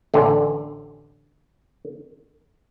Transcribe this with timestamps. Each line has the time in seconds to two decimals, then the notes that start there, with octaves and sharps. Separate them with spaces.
0.14 A1 D3